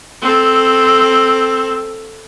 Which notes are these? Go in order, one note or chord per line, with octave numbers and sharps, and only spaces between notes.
C4 A4